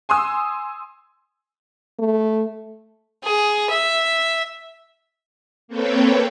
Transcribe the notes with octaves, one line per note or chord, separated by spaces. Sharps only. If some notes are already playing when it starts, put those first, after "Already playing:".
G#5 C6 D#6 E6
A3
G#4
E5
A#3 C4 A4 B4 C#5 G5